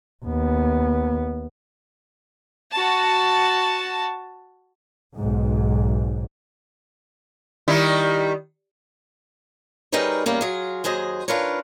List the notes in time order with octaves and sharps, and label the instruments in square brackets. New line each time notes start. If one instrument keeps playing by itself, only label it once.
[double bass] D#2 B3
[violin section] F#4 A5
[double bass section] B1 G#2
[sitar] D#3 G3 E4
[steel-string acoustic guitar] G3 D#4 G#4 A#4 B4 C#5
E2 G3 A#3 C#4
F#3 F4 G#4
D#2 F#3 G#4 C5 D#5
D#3 D4 F4 A#4 B4 C#5